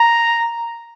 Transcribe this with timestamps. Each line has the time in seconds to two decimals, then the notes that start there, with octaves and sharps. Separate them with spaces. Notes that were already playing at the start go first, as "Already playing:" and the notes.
Already playing: A#5